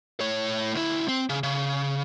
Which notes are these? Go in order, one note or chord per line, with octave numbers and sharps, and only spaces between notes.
A2 C#5
D2 E4
C4
C#3
C#3